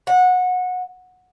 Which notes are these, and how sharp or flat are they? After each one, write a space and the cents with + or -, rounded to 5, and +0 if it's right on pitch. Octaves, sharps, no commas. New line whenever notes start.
F#5 -20